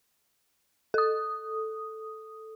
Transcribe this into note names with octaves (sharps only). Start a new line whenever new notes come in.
A4 D#6